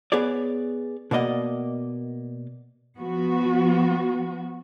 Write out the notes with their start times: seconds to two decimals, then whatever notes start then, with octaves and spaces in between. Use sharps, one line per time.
0.12 B3 G#4 C#5 D5
1.11 B2 A#3 D5 D#5 F#5
2.99 F3 B3 F#4